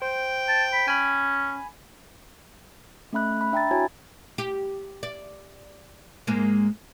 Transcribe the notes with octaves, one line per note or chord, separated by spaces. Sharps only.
C5 G5
A5
B5
C#4 G#5 B5
A3 C#4 E5 B5 F#6
B5
D4 E5 G5 A#5 B5 A6
E4 F#4 C#5 G#5 A#5 G#6
G4
D5
G#2 G#3 A#3